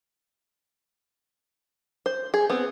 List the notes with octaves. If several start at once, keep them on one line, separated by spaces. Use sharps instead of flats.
C5
G#4
B3 C4